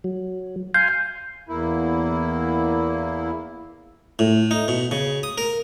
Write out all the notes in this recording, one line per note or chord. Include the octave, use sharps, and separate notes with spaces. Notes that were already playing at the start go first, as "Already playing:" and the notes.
F#3
F5 G#5 C6 G6
E2 A#3 E4
A2
D#4
B2
C#3
D#6
A#4